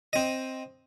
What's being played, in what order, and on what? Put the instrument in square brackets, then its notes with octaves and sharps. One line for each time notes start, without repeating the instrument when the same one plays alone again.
[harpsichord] C4 D#5